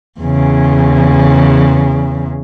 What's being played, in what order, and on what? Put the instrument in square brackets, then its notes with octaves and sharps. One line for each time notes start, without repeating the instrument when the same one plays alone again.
[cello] E2 C#3